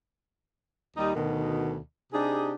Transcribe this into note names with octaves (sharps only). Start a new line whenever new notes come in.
D#2 G3 D#4
D2 B2 D#3
C3 D4 D#4 G4 G#4